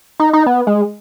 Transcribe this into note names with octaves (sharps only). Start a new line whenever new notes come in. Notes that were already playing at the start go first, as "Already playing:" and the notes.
D#4
D#4
B3
G#3